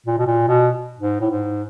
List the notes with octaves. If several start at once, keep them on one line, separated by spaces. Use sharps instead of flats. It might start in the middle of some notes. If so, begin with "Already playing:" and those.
A#2
B2
A#2
B2
G#2
A2
G#2